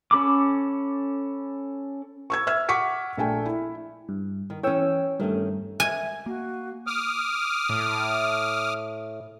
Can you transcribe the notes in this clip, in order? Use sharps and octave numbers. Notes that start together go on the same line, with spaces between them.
C#4 A4 B5 D6
C#6 E6 G#6
E5 E6 F6 G#6
F#5 C#6 D6 B6 C#7
A#1 A3 G5 G#5
E4
G2
D#3
E3 C#4 C#5 G5 E6
G2 D#3 A3 C#4
E5 G#5
A#3 F#4
D6 D#6 F6
A2